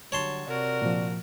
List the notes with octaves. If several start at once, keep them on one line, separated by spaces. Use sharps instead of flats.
D3 F#3 G3 C#5 A5 C6
C3 F#4 A#4 D5
A#2 F3